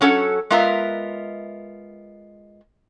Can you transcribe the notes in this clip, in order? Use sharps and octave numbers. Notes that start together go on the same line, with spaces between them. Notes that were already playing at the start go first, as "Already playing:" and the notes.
F#3 C#4 A4 F#5
G#3 B3 F4 A#4 E5